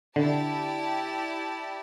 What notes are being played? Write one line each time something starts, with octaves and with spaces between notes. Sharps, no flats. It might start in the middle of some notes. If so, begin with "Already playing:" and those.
D3 E4 G4 D5 A5